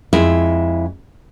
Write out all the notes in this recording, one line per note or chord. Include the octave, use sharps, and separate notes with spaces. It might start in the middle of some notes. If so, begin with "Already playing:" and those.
F2 G#3 E4